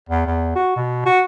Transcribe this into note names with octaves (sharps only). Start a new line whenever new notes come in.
E2
E2
F#4
B2
F#4